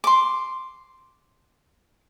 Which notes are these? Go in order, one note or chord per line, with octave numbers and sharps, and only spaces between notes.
C6 D6